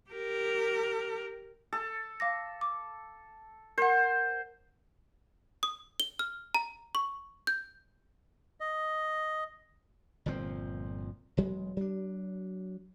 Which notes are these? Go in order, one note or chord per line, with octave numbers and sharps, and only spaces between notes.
G4 A#4
A4
F5 D6 A#6
D6
A#4 C5 F#5
D#6
G7
F6
A#5
C#6
G6
D#5
G1 A#2 F3 C4
E1 F#3 G#3
F#3 D4